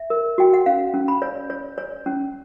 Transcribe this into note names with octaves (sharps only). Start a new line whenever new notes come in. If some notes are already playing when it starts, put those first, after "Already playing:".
Already playing: E5
A#4
F#4 G5
F#5
C#4 F5
C#4
B5
C#5
C#5
C#5
C#4